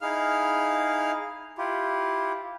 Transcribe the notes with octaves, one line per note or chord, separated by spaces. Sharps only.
D#4 E4 G#4 F5 F6
E4 F4 G4